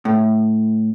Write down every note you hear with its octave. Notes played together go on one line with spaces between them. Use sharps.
A2